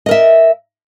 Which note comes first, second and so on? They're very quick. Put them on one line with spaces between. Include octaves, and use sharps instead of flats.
D#5 A#4 E5